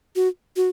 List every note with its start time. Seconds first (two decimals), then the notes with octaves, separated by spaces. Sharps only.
0.16 F#4
0.56 F#4